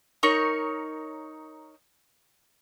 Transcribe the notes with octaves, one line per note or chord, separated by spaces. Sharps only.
D#4 A#4 C#5